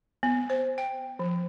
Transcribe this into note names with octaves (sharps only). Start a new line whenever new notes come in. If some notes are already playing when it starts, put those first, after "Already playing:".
B3
C5
G5
F3